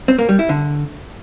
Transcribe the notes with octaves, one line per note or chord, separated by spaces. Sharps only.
C4
A#3
G3
E4
D3